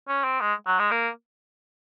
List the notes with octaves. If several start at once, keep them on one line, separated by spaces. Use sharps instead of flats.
C#4
C4
G#3
F#3
G#3
A#3